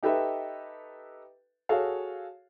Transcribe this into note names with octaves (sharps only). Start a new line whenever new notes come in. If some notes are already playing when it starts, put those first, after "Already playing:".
D#4 G4 A4 B4 E5
F#4 G#4 A4 C#5 F5